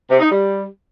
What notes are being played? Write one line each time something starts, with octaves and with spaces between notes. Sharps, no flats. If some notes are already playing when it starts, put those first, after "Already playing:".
C3
D#4
G3